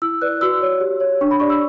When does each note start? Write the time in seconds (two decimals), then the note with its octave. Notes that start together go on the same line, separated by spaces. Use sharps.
0.02 E4 E6
0.21 B4 D5 F#6
0.41 F#4 E6
0.62 C#5
0.81 G4
1.00 C#5
1.21 D4 C#6
1.31 B5
1.40 G4 D5 C#6
1.50 E6